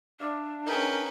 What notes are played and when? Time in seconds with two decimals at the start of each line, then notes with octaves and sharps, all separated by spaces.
0.20 D4 D5 E5 F5
0.66 C#4 D#4 G#4 A#4 B4 G5